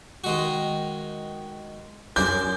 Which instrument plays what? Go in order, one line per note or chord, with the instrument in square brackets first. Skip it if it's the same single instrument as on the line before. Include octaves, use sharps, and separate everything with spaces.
[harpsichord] D#3 G#3 F#4
[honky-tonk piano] F#2 G6 [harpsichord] A#4 C5 D5